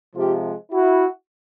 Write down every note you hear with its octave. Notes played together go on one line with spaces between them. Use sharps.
C3 F3 G#3 F4 G4
E4 F#4